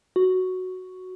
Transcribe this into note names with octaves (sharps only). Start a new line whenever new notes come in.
F#4